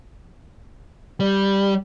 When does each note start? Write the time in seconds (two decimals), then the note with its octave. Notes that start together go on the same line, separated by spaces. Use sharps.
1.20 G3